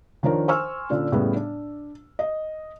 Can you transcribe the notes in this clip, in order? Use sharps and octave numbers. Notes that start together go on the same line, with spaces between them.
D#3 F3 D4 A#4 C#5
C5 G#5 C#6 E6 F6
A#2 D3 C#4
A2 C#3 G3 B3
D4
D#5